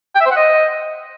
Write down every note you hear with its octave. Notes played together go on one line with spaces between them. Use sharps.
G5
E5
C5
F#5
D#5